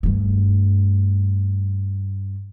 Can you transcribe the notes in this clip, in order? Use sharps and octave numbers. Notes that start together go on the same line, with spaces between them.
G2 A3